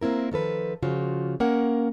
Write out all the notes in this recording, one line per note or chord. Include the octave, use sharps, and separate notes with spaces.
A#3 C4 E4 A#4
D#3 F3 A4 B4
C#3 F3 F4 F#4
A#3 C#4 A#4 F#5